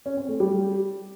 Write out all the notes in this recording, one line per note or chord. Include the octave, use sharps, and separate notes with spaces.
C#4
C4
A3
G3